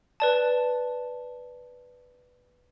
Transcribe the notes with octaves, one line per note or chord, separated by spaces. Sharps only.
B4 D5 A5